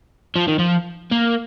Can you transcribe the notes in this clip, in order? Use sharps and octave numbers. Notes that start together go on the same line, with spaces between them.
F3
D#3
F3
A#3